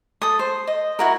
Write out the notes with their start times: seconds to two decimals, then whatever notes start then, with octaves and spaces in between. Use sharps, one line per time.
0.22 A4 D#6
0.39 C5
0.67 D#5
0.99 E4 F#4 A#4